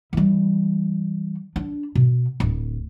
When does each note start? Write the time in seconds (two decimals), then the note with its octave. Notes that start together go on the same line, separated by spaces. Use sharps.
0.13 E3 G3
1.56 D4
1.95 B2
2.40 D1